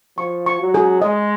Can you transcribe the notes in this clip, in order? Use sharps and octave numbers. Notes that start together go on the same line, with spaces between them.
F3 C#6
C#6
F#3
G#4
G#3 D#5